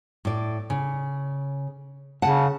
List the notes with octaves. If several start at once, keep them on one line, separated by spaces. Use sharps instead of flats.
A2 D5
C#3
C#3 F#5 A5